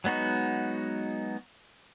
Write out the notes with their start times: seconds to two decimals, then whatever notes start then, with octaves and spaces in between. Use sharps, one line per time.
0.04 F#3 G#3 B3 D#4 F#4